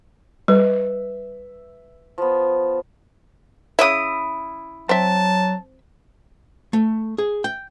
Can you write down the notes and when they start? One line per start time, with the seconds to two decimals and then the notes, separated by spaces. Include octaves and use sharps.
0.48 G3 B4 E5
2.18 F3 B3
3.79 C#3 E4 C#5 E5 D#6
4.89 F#3 C4 E5 A5
6.73 A3
7.18 G#4
7.44 G5